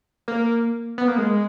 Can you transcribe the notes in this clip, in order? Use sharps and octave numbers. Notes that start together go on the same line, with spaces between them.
A#3
B3
A#3
G#3